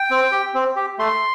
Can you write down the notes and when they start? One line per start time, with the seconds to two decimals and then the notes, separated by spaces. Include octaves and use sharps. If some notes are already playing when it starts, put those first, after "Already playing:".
Already playing: G5
0.10 C4
0.32 G4
0.54 C4
0.76 G4
0.99 A3 C6